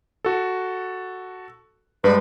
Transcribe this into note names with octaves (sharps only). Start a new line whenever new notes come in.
F#4 A4
G2 G#3 B4 D5